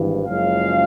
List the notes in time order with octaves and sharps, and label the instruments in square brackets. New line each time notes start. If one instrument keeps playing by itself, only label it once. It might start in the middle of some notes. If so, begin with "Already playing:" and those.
Already playing: [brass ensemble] G#1 G2 E3
F#1 F#2 C#3 F3 G#3 F5